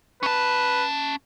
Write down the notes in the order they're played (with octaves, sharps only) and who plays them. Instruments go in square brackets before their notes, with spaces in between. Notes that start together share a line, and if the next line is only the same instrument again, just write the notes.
[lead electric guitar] C#4 A5 [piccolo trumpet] B4